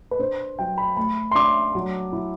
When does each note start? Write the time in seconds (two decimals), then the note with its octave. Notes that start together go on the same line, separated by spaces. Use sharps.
0.11 B4
0.19 D4 C5
0.59 F#3 G5
0.78 B5
0.96 A3 B5
1.31 C6
1.35 D4 D6
1.75 F#3
2.13 E4